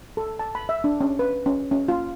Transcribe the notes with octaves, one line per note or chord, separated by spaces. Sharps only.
A4
A5
B5
E5
D4
C#4
B4
C#4
C#4
F4